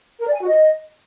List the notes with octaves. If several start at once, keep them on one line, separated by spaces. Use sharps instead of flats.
A#4
D5
G#5
F#4
D#5